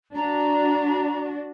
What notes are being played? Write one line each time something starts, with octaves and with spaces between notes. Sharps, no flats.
D4 F#4 A#5